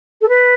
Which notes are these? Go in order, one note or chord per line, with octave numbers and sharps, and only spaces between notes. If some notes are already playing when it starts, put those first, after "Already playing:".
A4
B4